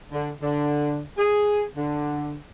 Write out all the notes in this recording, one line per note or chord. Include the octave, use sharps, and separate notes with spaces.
D3
D3
G#4
D3